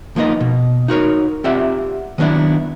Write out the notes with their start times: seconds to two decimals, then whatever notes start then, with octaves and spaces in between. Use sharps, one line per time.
0.16 F3 A#3 B3 D#4 D#5
0.40 B2
0.88 D#4 F#4 A#4 C#5
1.44 C4 F4 G4 D5 E5 F#5
2.18 D#3 F#3 B3 D4 E4